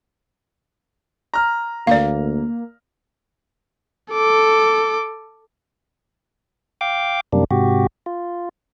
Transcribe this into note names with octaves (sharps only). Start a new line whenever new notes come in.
A#5 F6
D2 A#3 D5 F5
A4 D6
F5 G5 D6
F#2 C3 G3 A#3 D4
G#2 C3 F#4 G4
F4